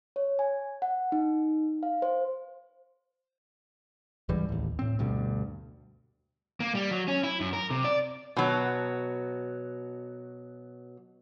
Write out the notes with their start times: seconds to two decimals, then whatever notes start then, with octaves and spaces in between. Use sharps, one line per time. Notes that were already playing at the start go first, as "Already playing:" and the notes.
0.16 C#5
0.39 G#5
0.82 F#5
1.12 D#4
1.83 F5
2.02 C5
4.29 C#2 G#2 E3 G3
4.49 A1 D#2
4.79 A2 C4
4.99 D2 G2 B2
6.60 A#3
6.75 G3
6.91 F#3
7.08 C#4
7.23 E4
7.41 F#2
7.53 A#4
7.70 C3
7.84 D5
8.37 B2 F#3